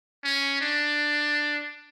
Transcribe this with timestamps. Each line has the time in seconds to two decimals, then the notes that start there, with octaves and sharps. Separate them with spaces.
0.24 C#4
0.61 D4